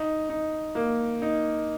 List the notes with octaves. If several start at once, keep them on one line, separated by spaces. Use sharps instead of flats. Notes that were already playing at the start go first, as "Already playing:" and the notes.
Already playing: D#4
D#4
A#3
D#4